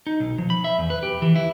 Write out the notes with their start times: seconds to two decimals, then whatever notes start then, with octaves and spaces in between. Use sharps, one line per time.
0.07 D#4
0.20 B1
0.38 F3
0.50 B5
0.64 E5
0.78 E2
0.90 B4
1.03 G4
1.22 E3
1.36 E4